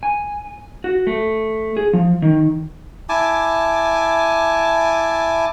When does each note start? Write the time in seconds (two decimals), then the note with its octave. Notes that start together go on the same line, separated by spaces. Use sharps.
0.03 G#5
0.84 F#4
1.07 A3
1.77 G#4
1.93 F3
2.22 D#3
3.09 E4 G#5 A5 D6